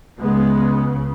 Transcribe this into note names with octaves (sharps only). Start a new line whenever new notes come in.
C#2 C#3 G#3 B3